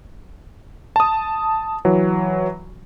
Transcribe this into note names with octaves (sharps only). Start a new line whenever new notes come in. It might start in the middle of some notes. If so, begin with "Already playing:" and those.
A5 D#6
E3 F#3